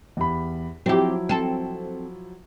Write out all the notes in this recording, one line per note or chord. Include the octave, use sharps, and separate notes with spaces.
E2 G4 B5
F3 F#3 C4 E4 G4
C4 A4